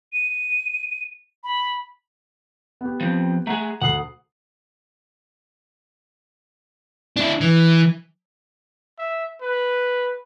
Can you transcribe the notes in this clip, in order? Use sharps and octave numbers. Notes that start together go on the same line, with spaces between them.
D#7
B5
B3 G4
F3 C4
A3 G#4 F#5 A#5
D2 F#5 D#6 C7
D4 E4
E3
E5
B4